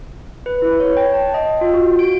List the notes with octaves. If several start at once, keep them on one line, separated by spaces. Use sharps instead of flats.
B4
E4
C#5
G5
A5
D#5
F4
F#4
D7